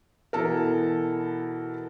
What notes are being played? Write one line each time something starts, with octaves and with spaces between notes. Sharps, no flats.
B2 E3 A4 A#4